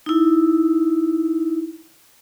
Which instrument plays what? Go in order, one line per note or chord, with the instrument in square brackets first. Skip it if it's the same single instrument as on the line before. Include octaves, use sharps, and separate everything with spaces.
[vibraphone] D#4 E4